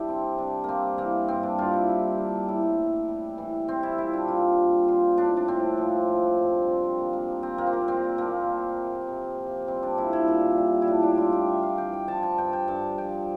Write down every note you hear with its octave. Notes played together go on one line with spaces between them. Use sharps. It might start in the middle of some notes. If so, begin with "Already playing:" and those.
Already playing: G3 D4 E4 G4
C3 C4
C3 D4
G3 A#3 C4
E3 A#3
G2 C4
D4
G2 F4
E4
G3 E4
E3 D4
A2 E4
A2
G3
E3
G3 C4
E4
A#2 E4
D4
A#2 F4
G3
F3 F4
A2 D4
D4
A2 C4
F3
F3
G2
G2 C4
C4
F3 A#3
A#3
F3
C4
A#2 A#3
C4
A#3
A#2 C4
F3 A#3
F3
C3
C3
F3
G3 C4
D4
A#2 E4
E4
A#2
G3
E4
A2 D4
D4
A2 F4
G4
G3 E5
F5
E3 G5
G5
F3 A5
A5
G2 G5
G5
G2 A5
F3 G5